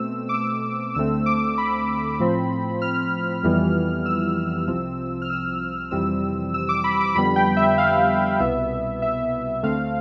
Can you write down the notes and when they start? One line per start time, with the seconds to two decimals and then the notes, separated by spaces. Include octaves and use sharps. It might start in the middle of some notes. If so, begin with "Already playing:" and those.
Already playing: B2 A3 C4 E6
0.29 D6
0.34 E6
0.95 D2 D3 A3 C4 E6
1.26 D6
1.58 B5
2.20 A2 F3 C4
2.82 F6
3.43 F2 E3 G3 B3
4.06 E6
4.67 C2 C3 F3 C4
5.22 F6
5.30 E6
5.91 F2 C3 E3 G3 C4 E6
6.54 E6
6.69 D6
6.84 B5
7.01 D6
7.15 F2 D3 G3 B3 B5
7.36 G5
7.57 E5
7.78 F5
8.39 C2 B2 B3 E5
9.02 E5
9.63 D2 D3 A3 C4 F5